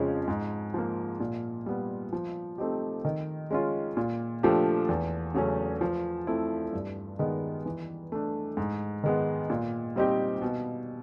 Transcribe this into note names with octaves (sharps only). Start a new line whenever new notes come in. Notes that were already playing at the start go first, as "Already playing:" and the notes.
Already playing: F2 C#3 F3 G#3 C#4
G#2
F3 A#3
A#2
G3 B3
F3
A3 C4 D#4 G4
D#3
G#3 C#4 F4
A#2
F3 A3 D4 G4
E2
C#3 F#3 A3 C#4
F3
A3 C4 E4
G2
D#3 G#3 B3 D#4
E3
A3 D4
G#2
D#3 G#3 B3
A#2
G3 C4 D#4 G4
B2